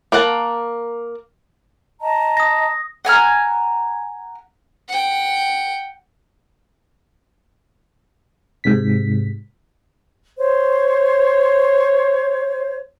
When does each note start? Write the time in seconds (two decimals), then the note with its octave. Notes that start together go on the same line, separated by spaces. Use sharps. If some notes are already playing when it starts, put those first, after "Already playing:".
0.12 A#3 A#4 F#5 A5
2.01 D#5 A5 A#5
2.37 D#6 A#6
3.05 F#5 G#5 A#5 F6
4.88 F#5 G5
8.64 G#2 C3 B6
10.37 C5 C#5